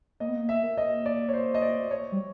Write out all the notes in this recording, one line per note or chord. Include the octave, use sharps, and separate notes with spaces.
A#3 D#5
B3
A#3
E5
A#3
D#5
D5
C#5
C5
D#5
D5
C#5
G3